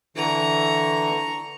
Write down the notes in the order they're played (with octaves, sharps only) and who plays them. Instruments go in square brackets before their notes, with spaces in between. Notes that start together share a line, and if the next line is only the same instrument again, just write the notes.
[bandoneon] D3 E3 [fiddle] A#5 C#6